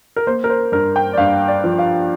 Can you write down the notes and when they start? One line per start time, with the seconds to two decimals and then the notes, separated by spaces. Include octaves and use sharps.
0.16 A#4
0.27 A#3 C5
0.44 A#4
0.49 C5
0.72 G2 A#4
0.96 G5
1.13 D5
1.17 G2 F5
1.48 D5
1.64 F3
1.78 F5